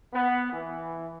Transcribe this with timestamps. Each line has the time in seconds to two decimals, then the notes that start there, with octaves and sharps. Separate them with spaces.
0.12 B3
0.52 E3